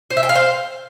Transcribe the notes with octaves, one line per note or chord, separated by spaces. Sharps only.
C5
E5
G5
F5
C5